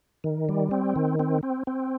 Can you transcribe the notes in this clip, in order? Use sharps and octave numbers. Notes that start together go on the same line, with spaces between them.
D#3
G3
C4
D#3
C4
C4
C4